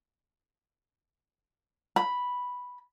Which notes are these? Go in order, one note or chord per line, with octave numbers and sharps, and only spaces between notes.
B5